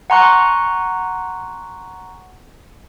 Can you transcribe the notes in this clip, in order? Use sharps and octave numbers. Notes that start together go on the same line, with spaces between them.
F#5 G#5 A#5 C6 C#6 F#6